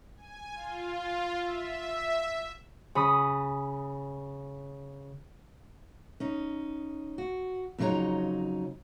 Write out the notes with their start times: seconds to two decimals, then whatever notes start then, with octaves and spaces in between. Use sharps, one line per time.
0.16 G#5
0.54 F4
1.40 E5
2.95 C#3 B5 D#6
6.20 C#4 D#4
7.18 F#4
7.78 F2 C#3 F#3 D#4 C#5 A#5